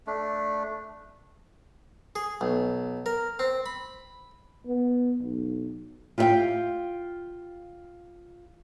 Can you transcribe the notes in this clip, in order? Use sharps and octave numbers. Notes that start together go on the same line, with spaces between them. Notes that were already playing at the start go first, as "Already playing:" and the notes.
A3 D4
G#4
B1
A#4
C4
B5
B3
B1
F4 G4 A4 E5 F5 G5